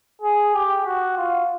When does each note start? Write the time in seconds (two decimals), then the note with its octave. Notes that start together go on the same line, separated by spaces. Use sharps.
0.22 G#4
0.54 G4
0.85 F#4
1.17 F4